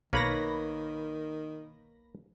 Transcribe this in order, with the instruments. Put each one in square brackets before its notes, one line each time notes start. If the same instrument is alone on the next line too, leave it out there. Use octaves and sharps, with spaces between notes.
[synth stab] B1 B5 A#6 [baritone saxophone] D#3 [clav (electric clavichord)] A#3 B4 C#5